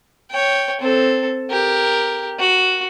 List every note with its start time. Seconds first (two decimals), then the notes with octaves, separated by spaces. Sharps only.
0.30 C#5 G5
0.81 C4 A4
1.50 G4 A#4
2.39 F#4